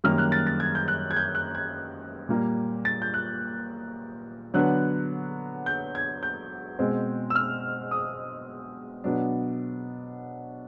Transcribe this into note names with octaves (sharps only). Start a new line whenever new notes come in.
F#2 D#3 G3 A#3 F6
F#6
A6
A6
G#6
G6
F#6
G#6
G6
F#6
G#6
A#2 G3 A#3
A6
G6
F#6
D3 F#3 B3 D4 F#6
G6
G#6
G6
B2 G#3 C4
E6
F6
D#6
B2 F#3 B3 D4